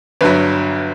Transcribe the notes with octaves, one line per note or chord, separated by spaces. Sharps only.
G1 G2 F#3 B4